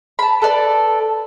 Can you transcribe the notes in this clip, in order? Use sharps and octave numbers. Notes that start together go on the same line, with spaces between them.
A5 B5
A4 B4 D5